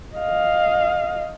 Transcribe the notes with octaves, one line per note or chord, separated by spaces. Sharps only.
D#5 F5